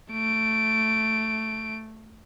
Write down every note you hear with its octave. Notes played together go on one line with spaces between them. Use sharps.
A3 D7